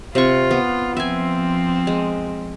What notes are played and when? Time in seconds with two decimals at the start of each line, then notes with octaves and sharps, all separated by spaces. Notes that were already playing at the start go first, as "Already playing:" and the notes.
0.15 C3 F4 C#6
0.51 B3
0.97 F3 C4 E5 G#5
1.87 G#3